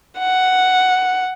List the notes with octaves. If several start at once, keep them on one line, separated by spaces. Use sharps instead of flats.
F#5